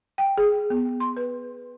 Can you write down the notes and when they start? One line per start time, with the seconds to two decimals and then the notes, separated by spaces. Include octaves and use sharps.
0.18 G5
0.38 G#4
0.70 B3
1.00 C6
1.17 B4